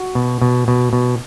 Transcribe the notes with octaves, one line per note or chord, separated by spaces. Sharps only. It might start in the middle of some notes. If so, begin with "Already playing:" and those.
Already playing: F#4
B2
B2
B2
B2